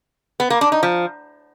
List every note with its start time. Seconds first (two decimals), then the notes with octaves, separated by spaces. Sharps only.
0.40 B3
0.50 A#3
0.61 D4
0.72 D#4
0.83 F3